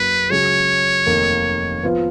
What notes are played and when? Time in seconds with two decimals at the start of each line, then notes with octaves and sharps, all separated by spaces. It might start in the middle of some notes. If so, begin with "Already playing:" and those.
Already playing: F#1 F#2 C#3 F#3 A#3 B4
0.30 C#2 C#3 F#3 C#4 G#4 C#5
1.06 F1 D#2 D#3 A#3
1.83 F3 B3 F4 B4